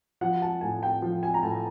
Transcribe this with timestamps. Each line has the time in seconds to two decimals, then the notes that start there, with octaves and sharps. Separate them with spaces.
0.21 F3 F#5
0.42 A5
0.61 A2 G#5
0.83 G5
1.02 F3
1.23 G#5
1.34 A#5
1.43 A2 A5